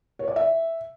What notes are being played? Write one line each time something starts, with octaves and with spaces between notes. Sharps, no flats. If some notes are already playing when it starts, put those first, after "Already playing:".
C#5
D5
E5